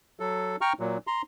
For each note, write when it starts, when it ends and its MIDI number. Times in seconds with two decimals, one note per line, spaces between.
0.20 0.56 54
0.20 0.56 69
0.61 0.73 79
0.61 0.73 82
0.61 0.73 85
0.61 0.73 89
0.80 0.98 46
0.80 0.98 54
1.07 1.22 82
1.07 1.22 84